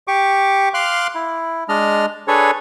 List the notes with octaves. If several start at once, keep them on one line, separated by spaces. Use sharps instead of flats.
G4 C#6 D6
F5 C6 D6 F6 F#6
E4
G#3 D4 D#5 F6
D4 G#4 A4 B4 C#5